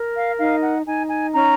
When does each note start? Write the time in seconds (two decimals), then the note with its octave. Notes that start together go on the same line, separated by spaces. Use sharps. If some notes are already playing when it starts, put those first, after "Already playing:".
Already playing: A#4
0.15 F5
0.38 D#4 F5
0.62 F#5
0.85 D#4 G#5
1.10 G#5
1.32 C#4 A#5